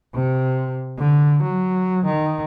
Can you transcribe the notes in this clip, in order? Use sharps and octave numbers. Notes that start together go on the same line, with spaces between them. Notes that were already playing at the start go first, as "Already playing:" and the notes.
C3
D3
F#3
D#3